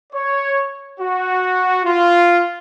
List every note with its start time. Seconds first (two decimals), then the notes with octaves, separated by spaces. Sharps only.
0.13 C#5
1.00 F#4
1.84 F4